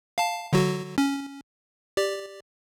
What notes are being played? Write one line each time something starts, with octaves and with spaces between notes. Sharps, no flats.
F5 A5
D3 F#3 F#4
C#4
G4 D5